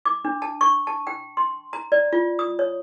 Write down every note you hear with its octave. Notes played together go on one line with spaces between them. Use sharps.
D6
D4
A5
C#6
A5
G5
C6
A#5
D5
F4
D#6
C#5